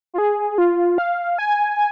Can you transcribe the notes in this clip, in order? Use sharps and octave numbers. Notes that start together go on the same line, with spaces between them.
F4
G#4
F4
F5
G#5